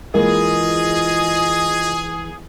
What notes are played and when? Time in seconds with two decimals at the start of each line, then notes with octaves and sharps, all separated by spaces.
0.14 E3 G#3 A#3 F4 G#4 D#5